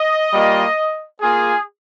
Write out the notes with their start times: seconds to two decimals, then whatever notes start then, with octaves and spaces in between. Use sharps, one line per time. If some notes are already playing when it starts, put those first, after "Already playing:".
Already playing: D#5
0.32 G3 A#3 F4
1.21 A#3 F4 G#4